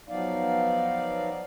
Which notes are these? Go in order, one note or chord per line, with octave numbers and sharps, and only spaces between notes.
F3 F#3 B3 D#4 D5 F5